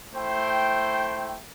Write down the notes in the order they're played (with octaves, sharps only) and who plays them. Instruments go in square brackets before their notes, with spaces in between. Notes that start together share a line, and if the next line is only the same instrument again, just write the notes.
[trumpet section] A3 E4 C5 G5